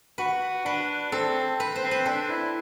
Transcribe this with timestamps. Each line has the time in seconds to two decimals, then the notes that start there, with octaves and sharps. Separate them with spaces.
0.18 F#4 B4
0.65 D4 B4
1.12 C4 A4
1.60 B4
1.76 C5
1.83 C4
1.91 B4
2.06 D4 A4
2.29 E4